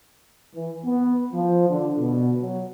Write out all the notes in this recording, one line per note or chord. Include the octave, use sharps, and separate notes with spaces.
E3
B3
F3
D3
B2
F#3